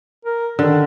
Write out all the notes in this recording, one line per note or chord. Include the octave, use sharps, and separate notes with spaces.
A#4
D3 D#3